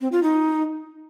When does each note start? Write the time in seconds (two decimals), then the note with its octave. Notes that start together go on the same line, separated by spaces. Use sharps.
0.01 C4
0.12 F4
0.23 D#4